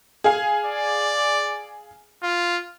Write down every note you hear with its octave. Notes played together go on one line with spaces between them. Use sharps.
G#4 F5 G#5
D5
F4